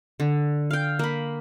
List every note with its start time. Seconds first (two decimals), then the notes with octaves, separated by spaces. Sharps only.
0.20 D3
0.71 F5 G5
0.99 A#3 B5